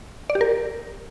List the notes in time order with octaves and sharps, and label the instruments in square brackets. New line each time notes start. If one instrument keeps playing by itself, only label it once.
[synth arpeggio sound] D5
G4
A#4